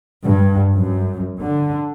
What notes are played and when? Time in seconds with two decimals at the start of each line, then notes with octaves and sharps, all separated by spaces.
0.24 G2
0.77 F#2
1.42 D3